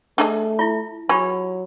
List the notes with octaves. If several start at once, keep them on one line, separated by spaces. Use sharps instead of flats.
A3 D4 G#4 D#5
E4 F4
F#3 F4 G4 G#4 B5